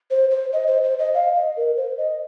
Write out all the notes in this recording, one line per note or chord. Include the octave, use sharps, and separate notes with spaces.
C5
C5
D#5
C5
C5
D#5
F5
D#5
A#4
C5
D#5